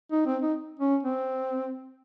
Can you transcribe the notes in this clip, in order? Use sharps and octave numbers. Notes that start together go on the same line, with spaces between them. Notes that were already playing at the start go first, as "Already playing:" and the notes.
D#4
C4
D#4
C#4
C4